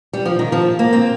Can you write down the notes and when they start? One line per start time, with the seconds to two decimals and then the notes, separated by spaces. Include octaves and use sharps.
0.13 G3
0.26 F3
0.39 D#3
0.52 F3
0.79 A#3
0.93 C4